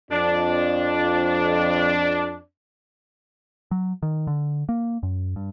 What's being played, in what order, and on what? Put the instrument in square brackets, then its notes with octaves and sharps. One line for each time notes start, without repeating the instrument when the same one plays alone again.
[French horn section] F2 [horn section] D4
[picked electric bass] F#3
D#3
D3
A#3
F#2
G2